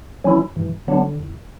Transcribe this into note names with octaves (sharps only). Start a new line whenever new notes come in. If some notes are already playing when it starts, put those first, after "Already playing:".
E3 F#3 C#4 E4
G2 E3
D3 F#3 B3 D4
E2